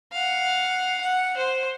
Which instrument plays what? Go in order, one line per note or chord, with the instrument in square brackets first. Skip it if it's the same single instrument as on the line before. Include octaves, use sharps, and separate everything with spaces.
[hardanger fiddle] F5 F#5
F#5
C5